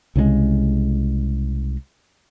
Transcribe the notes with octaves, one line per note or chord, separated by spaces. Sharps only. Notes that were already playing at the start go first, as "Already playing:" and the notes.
C2 C#3 F3 G#3